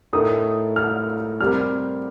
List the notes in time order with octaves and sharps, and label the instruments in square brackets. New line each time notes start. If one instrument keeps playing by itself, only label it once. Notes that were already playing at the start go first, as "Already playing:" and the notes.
[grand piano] A2 A3 D#4 A#4 [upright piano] D#6
[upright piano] F6
[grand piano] C3 G3 C4 G4 A#4 [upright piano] F6